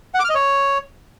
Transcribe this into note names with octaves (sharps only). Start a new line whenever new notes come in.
F#5
D6
F6
D#5
C#5